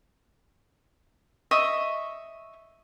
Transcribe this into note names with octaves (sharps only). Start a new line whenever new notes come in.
D#5 E5 C#6